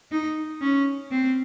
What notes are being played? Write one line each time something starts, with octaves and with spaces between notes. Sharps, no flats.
D#4
C#4
C4